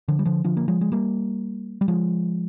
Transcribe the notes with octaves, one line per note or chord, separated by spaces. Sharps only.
D3 F3
G3
D3 F3
D3 F3
A#3
F3 G#3
G#3
G3 A#3
G3
F3 G#3